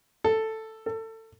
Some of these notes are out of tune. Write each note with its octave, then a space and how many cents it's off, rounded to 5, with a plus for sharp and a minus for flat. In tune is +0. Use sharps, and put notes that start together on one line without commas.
A4 +5
A4 +25